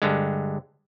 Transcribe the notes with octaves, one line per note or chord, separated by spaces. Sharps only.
G2 D3 G#3